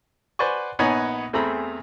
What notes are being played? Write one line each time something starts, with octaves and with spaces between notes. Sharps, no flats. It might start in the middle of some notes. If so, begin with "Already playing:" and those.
B4 C5 D5 F#5 G#5 C#6
A#1 B3 D#4 C#5 F#5 G#5
E2 A3 C4 G#4 A#5 B5